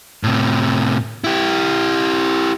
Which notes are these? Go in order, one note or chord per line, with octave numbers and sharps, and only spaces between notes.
A2 C3
E4 G4